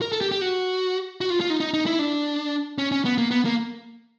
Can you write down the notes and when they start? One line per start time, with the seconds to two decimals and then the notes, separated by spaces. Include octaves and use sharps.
0.02 A#4
0.12 A4
0.21 G4
0.31 G4
0.41 F#4
1.21 F#4
1.30 F4
1.41 F4
1.50 D#4
1.60 D#4
1.74 D#4
1.86 E4
1.99 D4
2.78 C#4
2.92 C#4
3.05 B3
3.18 A#3
3.31 B3
3.45 A#3